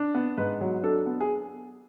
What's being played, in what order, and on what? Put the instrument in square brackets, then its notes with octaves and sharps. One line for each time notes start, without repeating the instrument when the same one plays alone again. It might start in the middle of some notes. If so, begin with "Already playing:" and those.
Already playing: [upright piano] D4
B3
G#2 B4
F#3
D4 A4
B3
G#4